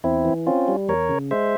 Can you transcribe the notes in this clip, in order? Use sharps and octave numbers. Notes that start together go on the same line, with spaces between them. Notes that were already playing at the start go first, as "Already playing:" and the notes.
E2 C4 E4
E3
C4 C#4 F4
G3
E2 A#4 C#5
C#3
G#3 C5 E5